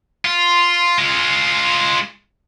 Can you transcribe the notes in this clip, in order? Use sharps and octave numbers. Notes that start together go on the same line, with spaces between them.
F4
G#3 F4